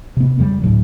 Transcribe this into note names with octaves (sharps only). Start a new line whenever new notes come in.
C3 B3
F2 C#3 G3
D2 A2 F#3